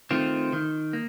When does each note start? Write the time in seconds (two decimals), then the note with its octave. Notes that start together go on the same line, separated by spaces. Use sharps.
0.11 D#3 A3 C4 F4
0.53 D#3
0.93 A#3